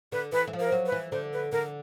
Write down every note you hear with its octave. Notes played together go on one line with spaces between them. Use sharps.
D3 B4
E3 B4
E3
F3
A#4
F#3
B4
E3
D3 C5
B4
D3 A#4